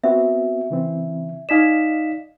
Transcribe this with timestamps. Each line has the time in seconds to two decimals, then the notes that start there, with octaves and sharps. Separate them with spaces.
0.04 B3 C4 F#4 E5
0.70 C#3 E3 C4
1.49 D#4 D5 D#5 F5 B6 E7